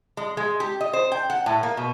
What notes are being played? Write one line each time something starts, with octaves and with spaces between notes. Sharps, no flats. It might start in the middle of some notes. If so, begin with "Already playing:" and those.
G#3
G#3
G4
D#5
C5
G5
F#5
A2
A#3
B2